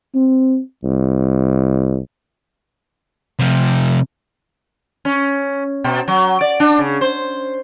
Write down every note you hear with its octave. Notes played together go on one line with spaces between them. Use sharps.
C4
C2
C3 F3
C#4
B2
F#3
D5
D4
C#3
C5